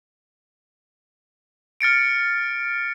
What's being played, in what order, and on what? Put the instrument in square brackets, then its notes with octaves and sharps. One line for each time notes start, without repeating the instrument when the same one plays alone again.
[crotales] F6 A6 C#7 D7